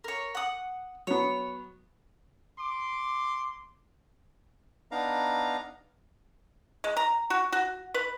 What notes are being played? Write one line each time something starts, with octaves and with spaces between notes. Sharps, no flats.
A#4 C#5
F#5 D#6
F#3 B3 C#5
C6 D6
B3 D4 D#4 F5 A#5
G#3
A#5
F#4
F#4
B4